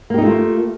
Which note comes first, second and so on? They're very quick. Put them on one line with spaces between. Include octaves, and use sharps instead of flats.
A#3 G4 D#4 A3 F4